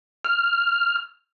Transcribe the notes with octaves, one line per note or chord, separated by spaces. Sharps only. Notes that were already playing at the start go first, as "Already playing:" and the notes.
F6